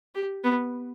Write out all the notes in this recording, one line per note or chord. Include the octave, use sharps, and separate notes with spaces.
G4
B3